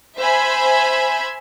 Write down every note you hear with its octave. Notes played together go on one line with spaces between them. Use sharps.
C5 E5 G#5 B5